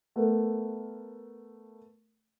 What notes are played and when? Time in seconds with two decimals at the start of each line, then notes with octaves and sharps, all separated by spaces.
0.16 A3 B3 A4 A#4